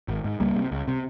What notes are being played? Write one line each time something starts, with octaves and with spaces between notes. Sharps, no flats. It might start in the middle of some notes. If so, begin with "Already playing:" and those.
G#1
G#2
C#2 G3 A#3
C3
C#2
C3